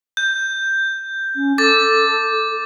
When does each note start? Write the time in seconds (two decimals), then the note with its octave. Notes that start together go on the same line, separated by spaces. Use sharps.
0.17 G6
1.36 C#4
1.58 A4 D6 A6